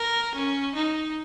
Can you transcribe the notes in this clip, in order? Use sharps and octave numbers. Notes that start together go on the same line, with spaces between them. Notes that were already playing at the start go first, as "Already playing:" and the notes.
Already playing: A#4
C#4
D#4